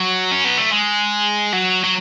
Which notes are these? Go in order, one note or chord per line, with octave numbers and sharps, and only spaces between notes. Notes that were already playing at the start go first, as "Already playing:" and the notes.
Already playing: F#3
C#4
B3
A3
G#3
F#3
F#3